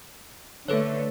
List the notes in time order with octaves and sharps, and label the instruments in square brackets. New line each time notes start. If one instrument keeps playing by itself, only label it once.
[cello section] D3 A3 [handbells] A4 B4 C#5